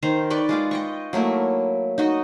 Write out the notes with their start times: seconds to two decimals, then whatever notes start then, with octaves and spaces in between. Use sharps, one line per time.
0.03 D#3 C5 A#5
0.30 B4 D5 G5 C#6
0.49 G#3 F4 D6
0.71 D#5 G5 C#6
1.13 F#3 A3 A#3 E4
1.98 D#4 F#4 D#5